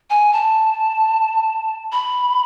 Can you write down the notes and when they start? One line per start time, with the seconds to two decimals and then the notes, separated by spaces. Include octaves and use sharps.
0.10 G#5
0.33 A5
1.92 B5